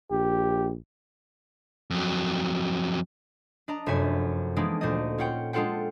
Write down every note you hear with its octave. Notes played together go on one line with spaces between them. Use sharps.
A#1 G4
F2 F#3
D4 D#5 A#5
F1 F#2 E5 G#5 B6 C#7
E3 G#3 A#3 B3 D4 D#4
D2 A#2 C5 D5 D#5
C#4 F4 F#5 G5
G#3 D4 F4 A4 F#5 G5